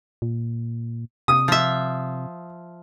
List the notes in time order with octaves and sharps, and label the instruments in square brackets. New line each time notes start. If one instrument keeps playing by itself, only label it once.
[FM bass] A#2
[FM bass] C3 [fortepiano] D#6
[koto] F3 E5